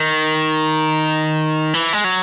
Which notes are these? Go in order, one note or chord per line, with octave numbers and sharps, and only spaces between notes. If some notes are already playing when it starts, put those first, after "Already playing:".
Already playing: D#3
E3
G#3
F#3